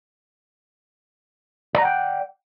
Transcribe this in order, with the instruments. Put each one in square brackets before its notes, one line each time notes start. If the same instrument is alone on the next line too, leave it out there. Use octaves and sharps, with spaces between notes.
[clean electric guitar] D5
A#5
F#5
G5